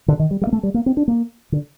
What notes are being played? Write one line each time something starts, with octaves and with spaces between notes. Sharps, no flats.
D3
D#3
G3
G3
A#3
A3
G3
A#3
C4
D4
A#3
D3